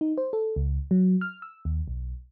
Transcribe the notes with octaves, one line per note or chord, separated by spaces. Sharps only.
D#4
C5
A4
C#2
F#3
F6
E6
D#2
B1